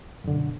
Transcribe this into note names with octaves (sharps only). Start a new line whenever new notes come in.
F#2 B2 D3